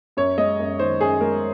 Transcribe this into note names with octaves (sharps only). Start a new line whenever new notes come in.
F#2 C#5
G#3 D#5
F#2
D#3 C5
F#2 G#4
G#3 A#4